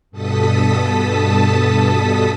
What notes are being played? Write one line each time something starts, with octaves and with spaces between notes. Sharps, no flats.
G2 B2 A4 A5 D#6 B6